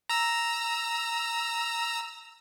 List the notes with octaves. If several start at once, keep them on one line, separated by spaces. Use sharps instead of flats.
A#5 E6